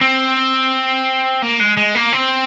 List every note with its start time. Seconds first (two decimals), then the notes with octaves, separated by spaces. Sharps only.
0.01 C4
1.42 A#3
1.60 G#3
1.77 G#3
1.95 A#3
2.12 C4